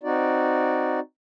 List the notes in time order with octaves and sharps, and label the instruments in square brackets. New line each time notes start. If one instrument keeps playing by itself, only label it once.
[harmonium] C4 D#4 F#4 D5